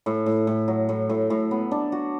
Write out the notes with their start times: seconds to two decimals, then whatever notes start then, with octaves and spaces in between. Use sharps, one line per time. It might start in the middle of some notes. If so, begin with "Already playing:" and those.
0.06 A2
0.26 A2
0.47 A2
0.68 F#3
0.89 A2
1.09 A2
1.30 A2
1.51 B3
1.71 D4
1.92 F#4